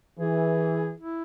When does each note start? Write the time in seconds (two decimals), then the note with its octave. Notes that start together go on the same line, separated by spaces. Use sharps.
0.18 E3 G#4
1.00 E4